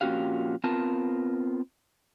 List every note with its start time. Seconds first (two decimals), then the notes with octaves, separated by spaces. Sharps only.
0.01 F2 A#2 C#4 F#4 G4 F5
0.64 B3 C4 F4 A#4 A5